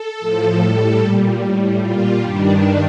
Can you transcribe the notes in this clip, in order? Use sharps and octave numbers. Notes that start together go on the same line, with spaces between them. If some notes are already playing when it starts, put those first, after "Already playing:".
Already playing: A4
A2 F3
A2 G3
A#2 G3
A2 G3
A#2 G3 F4
G2 D#3 G3 D4